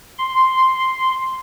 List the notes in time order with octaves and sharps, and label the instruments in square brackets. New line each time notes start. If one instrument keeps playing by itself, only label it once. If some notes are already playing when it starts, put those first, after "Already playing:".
[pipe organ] C6